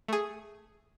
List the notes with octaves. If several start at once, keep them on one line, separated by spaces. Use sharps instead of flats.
A3 G#4